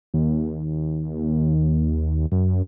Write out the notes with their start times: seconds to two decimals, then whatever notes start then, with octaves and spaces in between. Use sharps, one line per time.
0.14 D#2
2.32 F#2